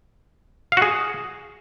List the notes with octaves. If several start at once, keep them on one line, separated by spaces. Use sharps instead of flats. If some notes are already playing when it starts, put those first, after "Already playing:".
F5
F#4
G#4